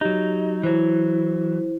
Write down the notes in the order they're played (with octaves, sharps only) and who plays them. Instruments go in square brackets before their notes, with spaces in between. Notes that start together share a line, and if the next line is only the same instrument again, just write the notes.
[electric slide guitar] F#3 D#4 [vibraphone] G4
[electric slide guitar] E3 F#3 [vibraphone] E4 C5